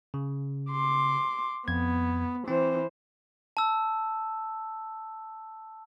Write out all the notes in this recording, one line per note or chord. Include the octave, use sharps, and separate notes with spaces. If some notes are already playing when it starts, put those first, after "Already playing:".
C#3
C6 D6
F2 B3 G#6
E3 C4 C5
A5 E6